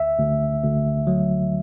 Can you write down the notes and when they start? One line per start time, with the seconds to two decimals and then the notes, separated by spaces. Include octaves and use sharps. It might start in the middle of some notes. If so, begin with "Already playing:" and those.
Already playing: D2 E5
0.19 D2
0.63 D2
1.07 F#3